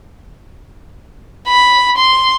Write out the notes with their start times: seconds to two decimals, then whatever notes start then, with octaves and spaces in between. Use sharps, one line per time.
1.48 B5
1.98 C6